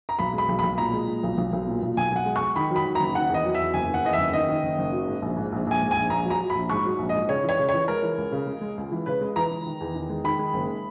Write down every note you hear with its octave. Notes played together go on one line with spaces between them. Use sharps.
A#5
B1 B5
G#3 B5
B1
B1 B5
A#2 A#5
G#3
A#2
B1
B1
B1
A#2
B1
B1 G#5
B1 F#5
G#3
C#6
G#3
D#3 B5
F#3
B5
D#3
F#1 A#5
D#3 F#5
E2 D#5
F#3
E5
E2
F#1 G#5
D#3 F#5
E2 D#5
E5
F#1
D#3 D#5
D#3
F#1
F#1
F#3
G#2
A#1
G#2
A#1
A#1 G#5
G#2
G#5
A#1
A#1 A#5
F#3
A#5
F#3
B5
A#1
G#2 C#6
F#3
A#1
D#5
G#2
C#3 C#5
E3
C#5
C#3
E3 C#5
G#3 A#4
E3
C#2
C#3
G#3
G#3
C#2
E3
C#3 B4
G#3
E3 A#5
E3
D#3
E2
D#3
G#3
D#3 B5
G#3
F#1